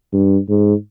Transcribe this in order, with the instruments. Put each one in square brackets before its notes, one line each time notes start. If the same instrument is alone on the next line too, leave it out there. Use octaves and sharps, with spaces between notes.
[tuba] G2
G#2